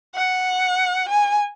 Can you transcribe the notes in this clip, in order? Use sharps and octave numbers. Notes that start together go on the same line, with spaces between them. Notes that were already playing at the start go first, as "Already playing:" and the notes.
F#5
G#5